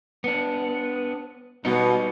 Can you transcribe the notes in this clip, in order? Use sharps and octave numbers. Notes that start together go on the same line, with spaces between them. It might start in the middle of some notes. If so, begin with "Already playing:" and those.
B3 D4
B2 G3 B3 D#4